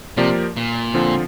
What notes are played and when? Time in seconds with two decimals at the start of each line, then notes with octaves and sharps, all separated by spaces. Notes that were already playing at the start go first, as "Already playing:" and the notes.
0.17 C3 F3 A#3 G4 A#4 D5
0.57 A#2
0.94 D3 F3 C4 F4